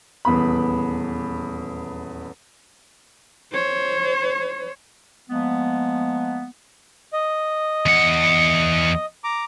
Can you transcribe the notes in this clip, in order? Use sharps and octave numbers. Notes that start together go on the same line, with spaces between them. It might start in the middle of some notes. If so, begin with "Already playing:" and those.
D#1 E2 B3 B5
C5 C#5
F3 G#3 A#3 B3
D#5
E2 F#5
A#5 D6